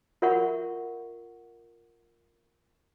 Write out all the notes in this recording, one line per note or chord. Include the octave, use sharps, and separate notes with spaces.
F4 A#4 E5 F#5 B5 C#6